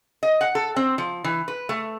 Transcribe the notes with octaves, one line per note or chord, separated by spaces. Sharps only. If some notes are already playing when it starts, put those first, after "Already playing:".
D#5
F#5
A4
C4
F3
E3
B4
A3